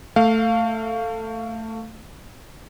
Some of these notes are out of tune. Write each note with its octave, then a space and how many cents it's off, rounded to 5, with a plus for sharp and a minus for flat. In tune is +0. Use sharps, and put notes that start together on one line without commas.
A3 +15 F5 +0